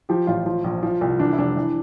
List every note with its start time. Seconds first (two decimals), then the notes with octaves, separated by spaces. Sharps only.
0.09 F3 G4
0.27 A1 F4
0.46 F3
0.64 A#1
0.83 F3
1.01 C2
1.19 E3 D4
1.33 E4
1.38 F1 D4
1.56 E3